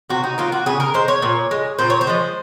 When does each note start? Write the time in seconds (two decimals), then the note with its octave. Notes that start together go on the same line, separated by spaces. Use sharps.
0.10 C3 F#4
0.24 D#4
0.38 F#3 A#3 F4
0.52 F#4
0.66 C#3 G#4
0.80 A#4
0.94 G#3 C5
1.08 C#5
1.22 A#2
1.51 G#3
1.79 A#2 C5
1.90 C#5
2.01 C5
2.07 F3 G#3